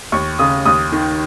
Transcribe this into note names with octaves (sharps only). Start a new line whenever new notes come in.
D#2 C#6
C#3 D#6
D#2 D#6
D#3